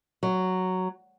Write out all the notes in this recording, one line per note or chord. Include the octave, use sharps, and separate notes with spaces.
F#3